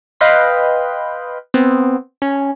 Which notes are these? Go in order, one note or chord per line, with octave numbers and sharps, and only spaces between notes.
B4 D#5 F5 G5 B5 C6
B3 C4
C#4